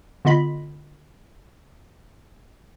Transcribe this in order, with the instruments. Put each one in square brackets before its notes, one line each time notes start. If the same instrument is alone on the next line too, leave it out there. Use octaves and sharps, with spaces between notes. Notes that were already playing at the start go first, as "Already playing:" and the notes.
[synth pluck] D3 B3 F4 D#5 B5 B6